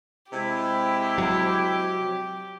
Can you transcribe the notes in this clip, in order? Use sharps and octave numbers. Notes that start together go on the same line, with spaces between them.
C3 G#3 E4 G4
F#3